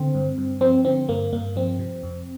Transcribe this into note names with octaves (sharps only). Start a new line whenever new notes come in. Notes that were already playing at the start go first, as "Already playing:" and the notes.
Already playing: D3 C4
G2
G2
F3 C4
D3 C4
G2 A#3
G2 A#3
F3 C4
C3
F2